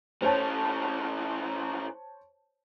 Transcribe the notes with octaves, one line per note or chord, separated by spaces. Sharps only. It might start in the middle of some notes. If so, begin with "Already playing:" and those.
A2 C#4 C5 C#5 A5